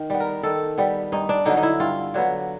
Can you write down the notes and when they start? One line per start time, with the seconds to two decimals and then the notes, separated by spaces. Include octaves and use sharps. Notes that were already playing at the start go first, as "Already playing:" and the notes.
Already playing: D#3
0.10 G3 B3
0.20 A#4
0.43 D#3 A4
0.78 G3 B3
1.12 G2 D#4
1.29 D4
1.45 D3 F#3 B3 D#4
1.57 D#4
1.63 E4
1.80 G2 F4
2.14 D3 F#3 B3